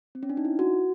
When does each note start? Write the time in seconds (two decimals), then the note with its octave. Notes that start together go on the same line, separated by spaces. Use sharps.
0.15 C4
0.23 C#4
0.30 D4
0.37 D#4
0.45 E4
0.59 F#4